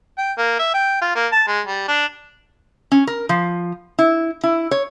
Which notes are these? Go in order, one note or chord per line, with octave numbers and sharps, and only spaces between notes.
G5
A#3
E5
G5
F4
A#3
A5
G#3
G3
D4
C#4
A#4
F3
E4
E4
C#5